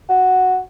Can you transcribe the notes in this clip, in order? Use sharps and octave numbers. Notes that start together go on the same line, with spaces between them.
F#4